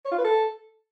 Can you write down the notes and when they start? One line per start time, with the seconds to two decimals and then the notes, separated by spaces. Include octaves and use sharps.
0.05 C#5
0.11 F4
0.18 B4
0.24 A4